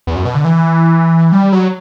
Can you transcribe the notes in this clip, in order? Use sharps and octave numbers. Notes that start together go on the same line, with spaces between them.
E2
F#2
B2
D3
E3
G3
F#3